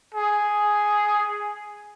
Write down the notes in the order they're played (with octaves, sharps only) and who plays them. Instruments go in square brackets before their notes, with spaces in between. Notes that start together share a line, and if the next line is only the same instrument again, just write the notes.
[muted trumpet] G#4